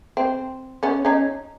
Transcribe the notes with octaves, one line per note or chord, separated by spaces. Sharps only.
C4
B3 C#4
C#4 D#4